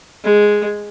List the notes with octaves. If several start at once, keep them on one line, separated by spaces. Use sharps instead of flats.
G#3